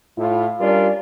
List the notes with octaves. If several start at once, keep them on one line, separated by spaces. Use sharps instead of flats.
A2 E4 F4
G3 C#4 D4 F4 A#4 D5